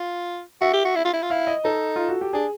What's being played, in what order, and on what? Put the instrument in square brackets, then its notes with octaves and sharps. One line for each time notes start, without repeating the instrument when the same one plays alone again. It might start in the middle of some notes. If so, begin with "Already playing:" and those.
Already playing: [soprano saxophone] F4
[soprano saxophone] F#4 [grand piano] E5
[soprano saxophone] G4
F#4
E4
F4
E4
F4
[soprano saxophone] E4 [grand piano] F5
[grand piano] D#5
[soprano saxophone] D#4 [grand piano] A4
[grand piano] F4
F#4
G4
[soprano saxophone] D4 [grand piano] G#4